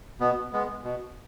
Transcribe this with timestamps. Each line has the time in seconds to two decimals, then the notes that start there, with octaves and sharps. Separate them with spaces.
0.20 B2 B3
0.53 G#3 B3
0.84 B2